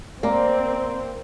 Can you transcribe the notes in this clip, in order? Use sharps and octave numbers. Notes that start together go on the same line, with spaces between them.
A#3 C4 D5 A#5